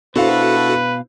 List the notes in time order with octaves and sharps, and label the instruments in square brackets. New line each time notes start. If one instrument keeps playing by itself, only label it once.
[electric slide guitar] B2 F5 [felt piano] D4 E4 C5 [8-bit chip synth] F#4 A4 [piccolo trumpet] B4